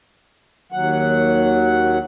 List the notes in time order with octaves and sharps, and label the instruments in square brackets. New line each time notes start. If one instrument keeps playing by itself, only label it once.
[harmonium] D#2 F#3 F#5